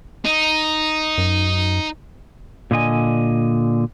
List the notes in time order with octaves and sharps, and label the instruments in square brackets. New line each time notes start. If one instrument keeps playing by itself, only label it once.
[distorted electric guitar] D#4
[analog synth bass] F#2
[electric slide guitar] A#2 D3 D#5 G#5